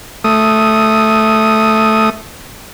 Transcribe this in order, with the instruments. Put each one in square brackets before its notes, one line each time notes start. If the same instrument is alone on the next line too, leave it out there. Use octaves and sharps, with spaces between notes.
[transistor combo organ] A3 D#6